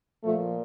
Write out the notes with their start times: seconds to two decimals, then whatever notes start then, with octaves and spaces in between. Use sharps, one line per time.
0.23 A#2 F3 A3